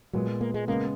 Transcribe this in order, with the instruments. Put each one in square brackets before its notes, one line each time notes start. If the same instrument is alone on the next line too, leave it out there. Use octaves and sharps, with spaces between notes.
[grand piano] A#2 G#3 B3 [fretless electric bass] F#3
[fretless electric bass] A#3
G#3
[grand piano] C#3 G#3 B3 [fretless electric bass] A#3